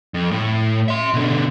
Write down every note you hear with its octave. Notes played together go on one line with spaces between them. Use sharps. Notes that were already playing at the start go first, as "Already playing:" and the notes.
F2
A2
E5 C6
B2 D3